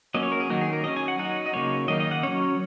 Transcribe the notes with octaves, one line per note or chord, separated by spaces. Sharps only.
F#3 A#3 C#4 D#5
C#5
A#4
G#4
D#3 F#3 A#3 D#4 F#4
G#4
A#4
F#3 C#4 D#5
G#5
F#5
F#3 D#4 F#5
D#5
C#3 F#3 A#3 D#4 C#5
D#3 A#3 D#4 D#5
D#5
F#5
F#3 C#4 C#5